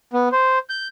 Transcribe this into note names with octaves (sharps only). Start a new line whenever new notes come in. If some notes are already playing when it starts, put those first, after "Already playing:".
B3
C5
G6